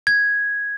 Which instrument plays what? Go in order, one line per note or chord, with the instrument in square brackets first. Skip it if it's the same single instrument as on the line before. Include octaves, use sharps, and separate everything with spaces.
[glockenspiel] G#6